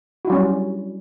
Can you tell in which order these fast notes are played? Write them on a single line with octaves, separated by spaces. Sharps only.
F#4 E4 F#3 C#4 G3